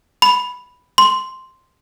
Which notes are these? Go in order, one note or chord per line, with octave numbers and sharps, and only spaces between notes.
B5
C6